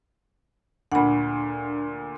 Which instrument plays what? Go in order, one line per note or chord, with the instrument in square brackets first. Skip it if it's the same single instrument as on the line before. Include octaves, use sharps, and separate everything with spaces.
[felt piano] D2 A#2 [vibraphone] D4 [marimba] F#5 B5